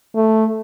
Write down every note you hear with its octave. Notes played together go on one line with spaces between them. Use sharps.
A3